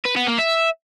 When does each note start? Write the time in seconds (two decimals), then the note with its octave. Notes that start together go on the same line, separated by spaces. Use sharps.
0.05 B4
0.17 B3
0.28 A#3
0.39 E5